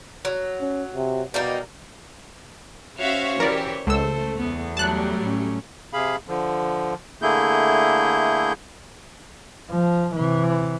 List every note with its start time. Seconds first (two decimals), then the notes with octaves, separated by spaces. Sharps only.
0.25 F#3
0.61 C#4
0.94 C3
1.34 B2 G3 A#3 D#4
2.99 C#4 F#4 C5 C#5 E5 F5
3.40 E3 G4 A#4 D5
3.87 C#2 A3 A4 C5 E6
4.38 E2 B3
4.77 F#3 G3 A3 A5 F#6
5.21 A2 C#4
5.93 C3 G#4 F5 B5
6.27 D3 F3
7.22 D3 A3 A#3 E4 G#4 G6
9.70 F3
10.15 C3 E3